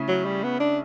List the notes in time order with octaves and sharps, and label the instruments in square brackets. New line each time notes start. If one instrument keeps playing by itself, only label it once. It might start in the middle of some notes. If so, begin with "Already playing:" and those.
Already playing: [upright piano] C#3 A3 C#4 E4
[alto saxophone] F#3
G3
B3
D4